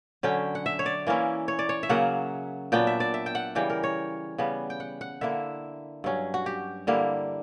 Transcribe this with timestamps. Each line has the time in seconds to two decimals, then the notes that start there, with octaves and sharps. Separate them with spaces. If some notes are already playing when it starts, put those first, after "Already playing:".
0.23 D3 F#3 C#4 G5
0.55 F#5
0.66 E5
0.79 C#5
0.86 D5
1.07 E3 A#3 C#4 E4
1.48 C#5
1.59 D5
1.69 C#5
1.83 E5
1.89 C#3 F#3 A#3 F#5
2.72 A#2 F#3 B3 D4 G5
2.87 E5
3.00 D5
3.14 E5
3.26 G5
3.35 F#5
3.55 C#3 E3 G3 G5
3.70 A#4
3.83 C#5
4.38 C#3 G3 B3
4.70 G5
4.80 F#5
5.01 F#5
5.21 D3 A#3 E4 E5
6.04 G2 F#3 C#4
6.34 F#4
6.46 G4
6.87 D3 G3 A#3 E4